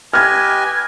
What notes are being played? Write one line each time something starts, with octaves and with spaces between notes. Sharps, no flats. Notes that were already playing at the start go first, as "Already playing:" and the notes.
G4 B4 D#5 G#5 F6 G#6